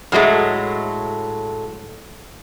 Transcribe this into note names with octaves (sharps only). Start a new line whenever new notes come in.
A2 F#3 G#3 A3